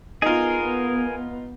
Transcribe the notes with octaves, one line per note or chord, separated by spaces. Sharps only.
B3 D#4 F4 G#4 A#4